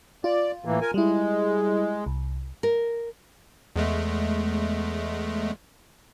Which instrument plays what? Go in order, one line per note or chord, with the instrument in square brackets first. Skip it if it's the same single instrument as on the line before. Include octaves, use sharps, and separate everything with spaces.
[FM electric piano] F4 [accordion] D5
[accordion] A2 E3 A#3
A#4 G#5
[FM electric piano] G3 E4 [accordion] G#3
[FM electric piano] C2
[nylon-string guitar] A#4
[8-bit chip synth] E2 G#3 A3